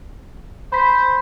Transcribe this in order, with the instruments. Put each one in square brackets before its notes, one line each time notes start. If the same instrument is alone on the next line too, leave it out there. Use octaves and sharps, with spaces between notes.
[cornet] C5 [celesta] B5 B6